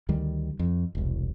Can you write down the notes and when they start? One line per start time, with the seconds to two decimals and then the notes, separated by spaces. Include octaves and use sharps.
0.09 D2 D#3 G3
0.59 F2
0.95 E1 C2